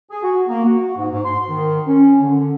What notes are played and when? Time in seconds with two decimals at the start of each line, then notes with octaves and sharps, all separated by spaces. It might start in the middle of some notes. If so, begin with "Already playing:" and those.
0.11 G#4
0.23 F#4
0.48 A#3
0.65 F#4
0.97 G#2
1.12 G#2
1.25 C6
1.50 D#3
1.87 C#4
2.22 D3